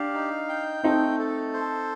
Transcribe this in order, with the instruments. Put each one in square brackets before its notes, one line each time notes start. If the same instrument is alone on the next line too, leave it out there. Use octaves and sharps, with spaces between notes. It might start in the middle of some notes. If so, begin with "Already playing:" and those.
Already playing: [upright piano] D4 [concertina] G4 F5
[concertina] D#4
G5
[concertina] A3 [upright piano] C4 D#4
[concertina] A4
C5